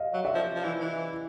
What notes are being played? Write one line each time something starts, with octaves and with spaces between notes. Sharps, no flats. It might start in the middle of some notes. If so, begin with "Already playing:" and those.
Already playing: D#5 F5
F#3
D5 E5
F3
F3
E3
E3